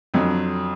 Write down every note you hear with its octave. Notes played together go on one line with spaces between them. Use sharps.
F2 D3 F#3